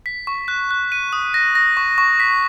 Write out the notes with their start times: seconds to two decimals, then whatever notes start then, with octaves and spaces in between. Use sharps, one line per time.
0.06 B6
0.27 C#6
0.48 F#6
0.71 F#6
0.92 D#7
1.13 D#6
1.34 A#6
1.55 A#6
1.77 C#6
1.98 C#6
2.20 B6